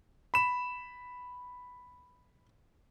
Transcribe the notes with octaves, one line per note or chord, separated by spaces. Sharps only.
B5 E7